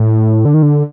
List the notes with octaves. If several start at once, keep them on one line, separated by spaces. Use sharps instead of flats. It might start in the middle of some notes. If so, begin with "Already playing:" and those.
Already playing: A2
D3
D#3
D3